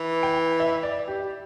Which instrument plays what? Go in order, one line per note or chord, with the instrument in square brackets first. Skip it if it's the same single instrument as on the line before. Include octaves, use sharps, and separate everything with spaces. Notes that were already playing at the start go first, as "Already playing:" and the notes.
Already playing: [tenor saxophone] E3
[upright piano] G5
E5
D5
G4